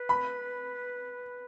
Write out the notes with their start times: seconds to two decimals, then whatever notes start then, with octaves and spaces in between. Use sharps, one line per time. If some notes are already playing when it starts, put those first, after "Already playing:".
Already playing: B4
0.09 B5